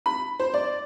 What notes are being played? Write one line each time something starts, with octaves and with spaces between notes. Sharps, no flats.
B5
C5
D5